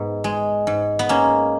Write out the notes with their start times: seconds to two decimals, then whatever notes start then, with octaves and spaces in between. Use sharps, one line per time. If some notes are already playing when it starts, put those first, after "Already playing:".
Already playing: G#2 B3
0.24 G#3
0.67 G#2
0.99 B3
1.09 G#3 A#3 C#4